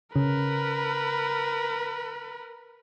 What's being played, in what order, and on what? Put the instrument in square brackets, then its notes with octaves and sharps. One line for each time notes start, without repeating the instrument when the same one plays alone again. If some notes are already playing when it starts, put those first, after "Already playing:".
[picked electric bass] C#3 [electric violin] A#4 B4